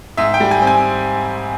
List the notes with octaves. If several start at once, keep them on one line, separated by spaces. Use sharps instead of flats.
G#2 E5
G5
G3
G#5
C4
G#5